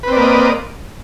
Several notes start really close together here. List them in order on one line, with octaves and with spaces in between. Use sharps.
B4 C4 D5 A#3 D#5